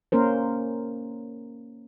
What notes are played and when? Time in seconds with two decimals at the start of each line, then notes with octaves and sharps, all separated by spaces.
0.12 A#3 C#4 A#4 C5